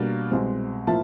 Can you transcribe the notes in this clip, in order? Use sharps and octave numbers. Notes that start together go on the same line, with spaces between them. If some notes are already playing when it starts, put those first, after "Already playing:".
Already playing: B2 G3 A#3 D4
C2 B2 G#3 C4
A2 F3 A#3 E4 A5